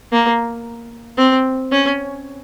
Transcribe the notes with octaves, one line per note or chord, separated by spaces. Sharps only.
A#3
C4
C#4